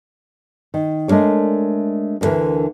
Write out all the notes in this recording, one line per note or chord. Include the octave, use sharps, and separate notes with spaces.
D#3
G#3 A3 D4 A#4 C#5
D2 A2 D3 E3 A#4